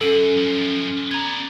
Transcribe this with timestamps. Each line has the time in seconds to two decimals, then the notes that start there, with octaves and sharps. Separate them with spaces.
0.01 F#2 C#4 A4 D7 D#7
0.36 F#2 F3
1.11 B3 D5 A#5 G#6